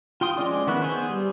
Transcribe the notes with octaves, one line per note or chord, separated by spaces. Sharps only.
F4 G5 C6 D#6
F3 G#3 C#4 D5
D#3 B3 E4 C#6 F#6
B3 G#4 C5
G3